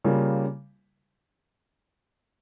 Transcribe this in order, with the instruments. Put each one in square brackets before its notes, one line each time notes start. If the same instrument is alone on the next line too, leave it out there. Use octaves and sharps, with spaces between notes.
[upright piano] C#3 G3 A#3 F4